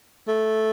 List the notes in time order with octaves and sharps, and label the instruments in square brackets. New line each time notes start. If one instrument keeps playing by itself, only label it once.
[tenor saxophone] A3